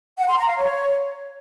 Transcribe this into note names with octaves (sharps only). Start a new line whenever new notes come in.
F#5
C6
A#5
F5
C#5